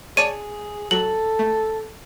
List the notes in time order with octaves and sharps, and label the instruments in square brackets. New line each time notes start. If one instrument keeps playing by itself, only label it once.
[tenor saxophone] G#4 [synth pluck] C#5 D5 A5 [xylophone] D#7
[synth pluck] F#3 [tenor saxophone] A4 [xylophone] F#7
[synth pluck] A3